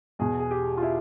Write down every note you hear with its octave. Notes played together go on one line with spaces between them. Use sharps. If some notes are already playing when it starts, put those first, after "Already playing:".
E2 B2 G#4
G#4
G4
F4
E4